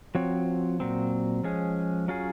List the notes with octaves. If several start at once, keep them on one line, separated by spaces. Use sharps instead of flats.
F3 C4 F#4 C#5
A#2 F#3 C4
F3 G#3 C#4 G#4
F#3 C#4 F4 G#4